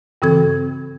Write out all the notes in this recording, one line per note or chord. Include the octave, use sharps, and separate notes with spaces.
G2 C#3 E3 C4 A4 G#6